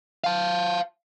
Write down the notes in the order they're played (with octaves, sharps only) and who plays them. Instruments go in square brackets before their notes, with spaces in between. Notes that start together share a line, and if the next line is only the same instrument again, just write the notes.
[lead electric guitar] F5 A5